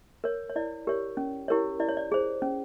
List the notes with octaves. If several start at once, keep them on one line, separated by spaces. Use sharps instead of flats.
A#4 C#5
C#5
E4 D5
G4 A#4 C#5
C#4
E4 G4 A#4 C#5
E4 D5
C#5
D5
G#4 C5
C#4